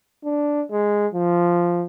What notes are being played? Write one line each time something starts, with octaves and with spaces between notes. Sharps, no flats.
D4
G#3
F3